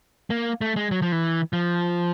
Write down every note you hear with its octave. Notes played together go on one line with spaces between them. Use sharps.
A#3
A3
G#3
F#3
F3
E3
F3